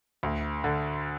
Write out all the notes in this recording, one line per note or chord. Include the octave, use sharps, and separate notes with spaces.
D2
D3